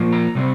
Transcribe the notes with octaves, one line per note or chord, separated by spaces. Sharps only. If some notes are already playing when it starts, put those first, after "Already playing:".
Already playing: A#2 F3 A#3
A#5
C3 G3 C4